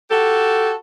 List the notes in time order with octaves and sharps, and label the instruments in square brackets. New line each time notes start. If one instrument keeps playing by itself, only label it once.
[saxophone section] F#4 G4 A4